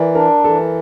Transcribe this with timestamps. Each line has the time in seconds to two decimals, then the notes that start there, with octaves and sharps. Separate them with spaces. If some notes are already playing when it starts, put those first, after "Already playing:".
Already playing: E3 A#4 D5
0.14 D4 A#4
0.44 E3 A4